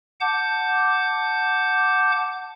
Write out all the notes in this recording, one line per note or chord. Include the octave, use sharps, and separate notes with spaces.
F#5 A5 D6 G6